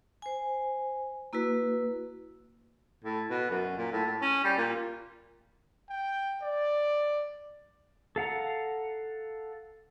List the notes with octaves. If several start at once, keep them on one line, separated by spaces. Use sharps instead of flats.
C5 G#5
A#3 E4 F#4 B4
A2
B2
F#2
A#2
A2
A2
C#4
G3
A#2
G5
D5
A4 F5 F#5 A#5